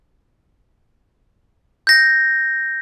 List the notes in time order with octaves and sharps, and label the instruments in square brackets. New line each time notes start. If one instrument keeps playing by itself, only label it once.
[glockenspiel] G6 A#6